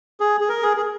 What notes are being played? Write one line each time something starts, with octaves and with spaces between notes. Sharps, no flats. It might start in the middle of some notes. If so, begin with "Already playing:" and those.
G#4
G#4
A#4
G#4
G#4